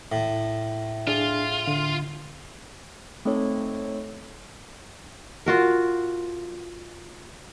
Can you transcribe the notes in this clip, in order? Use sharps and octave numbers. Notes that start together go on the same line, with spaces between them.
A2
D4 F4 G#4
D3
A3 C4 D#4 A4 C#5
F4 F#4 A#4